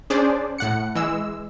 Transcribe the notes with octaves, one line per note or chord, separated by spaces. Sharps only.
C#4 D4 G#4 C5 D5
A2 F#5 C#7
E3 G#3 E6